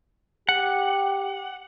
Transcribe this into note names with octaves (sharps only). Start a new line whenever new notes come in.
G4 F#5